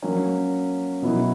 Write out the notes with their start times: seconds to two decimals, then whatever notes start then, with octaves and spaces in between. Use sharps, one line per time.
0.02 F#3 A#3 C#4
1.02 B2 F#3 B3 E4